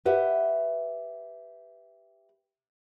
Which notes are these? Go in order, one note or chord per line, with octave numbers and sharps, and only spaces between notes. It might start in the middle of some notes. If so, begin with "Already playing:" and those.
G4 B4 E5 F#5